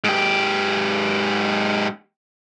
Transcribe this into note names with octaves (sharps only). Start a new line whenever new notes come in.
G#2 G4